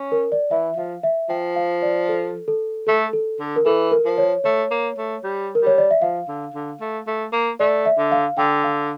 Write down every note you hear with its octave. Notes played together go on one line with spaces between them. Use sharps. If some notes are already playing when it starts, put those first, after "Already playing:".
Already playing: C#4
A#4
D5
E3 E5
F3 F5
E5
F3 G5
F5
D5
A4
A4
A3 A4
A4
D3
A#4
E3 A4
A#4
F3
C#5
A3 C#5
A#3
A3
G3
A#4
G3 C#5
D5
E5
F3 F5
D3
D3
A3
A3
A#3
A3 D5
E5
D3
F5
D3 G5
F5